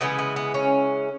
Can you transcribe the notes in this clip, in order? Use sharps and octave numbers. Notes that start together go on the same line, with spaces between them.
C#3 E3 G#3 B3
B3
B3
C#4